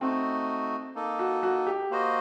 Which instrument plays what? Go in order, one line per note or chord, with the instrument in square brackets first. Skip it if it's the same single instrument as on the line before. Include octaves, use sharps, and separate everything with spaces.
[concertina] A3 D#4 F#4 [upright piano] C4
[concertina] A#3 D#4 A4
[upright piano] F#4
F#4
G4
[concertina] A#3 F#4 C5 D#5